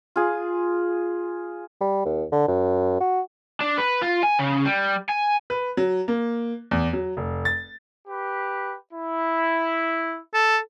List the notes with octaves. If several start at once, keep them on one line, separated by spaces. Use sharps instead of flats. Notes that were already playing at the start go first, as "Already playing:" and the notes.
F4 G#4
G3
D#2
D3
F#2
F#4
D4
B4
F4
G#5
C#3
G3
G#5
B4
F#3
A#3
E2
F#3
F1
A6
G4 B4
E4
A4